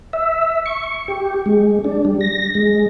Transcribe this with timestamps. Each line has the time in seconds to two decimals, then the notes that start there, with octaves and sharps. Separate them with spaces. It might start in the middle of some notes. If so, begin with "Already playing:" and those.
0.13 E5
0.66 C#6
1.08 G4
1.46 G#3
1.85 D4
2.05 G3
2.21 A#6
2.55 G#3